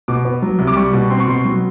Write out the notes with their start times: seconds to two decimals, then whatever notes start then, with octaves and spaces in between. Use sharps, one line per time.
0.08 B2 D6
0.25 B3
0.42 F#3
0.59 C2
0.67 D6
0.76 G3 C#6
0.93 B2
1.10 C4 C6
1.20 C#6
1.28 B2 C6
1.45 F#3